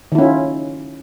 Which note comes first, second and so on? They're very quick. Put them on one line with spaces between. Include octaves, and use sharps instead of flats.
D#3 E4 C#4 F4